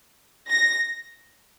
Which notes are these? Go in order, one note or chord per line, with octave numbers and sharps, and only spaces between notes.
A#6